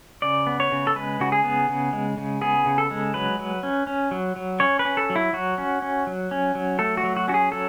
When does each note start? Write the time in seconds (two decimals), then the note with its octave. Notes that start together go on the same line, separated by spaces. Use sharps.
0.22 C#3 D5
0.47 B3
0.60 C#5
0.72 C#3
0.87 A4
0.95 G#3 B4
1.20 C#3 F#4
1.32 G#4
1.44 B3
1.69 C#3
1.93 G#3
2.18 C#3
2.41 B3 G#4
2.66 C#3
2.78 A4
2.91 G#3
3.14 F#3 B4
3.39 F#3
3.63 C#4
3.87 C#4
4.11 F#3
4.36 F#3
4.60 C#4 C#5
4.79 B4
4.85 C#4
4.97 A4
5.10 F#3
5.16 E4
5.33 F#3 F#4
5.58 C#4
5.82 C#4
6.07 F#3
6.31 C#4
6.55 F#3
6.79 A3 A4
6.97 F#4
7.03 F#3
7.16 F#4
7.28 C#4 F#4
7.34 G#4
7.52 F#3 A4